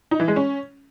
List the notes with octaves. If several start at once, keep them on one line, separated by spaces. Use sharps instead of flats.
D#4
E3
G#3
C#4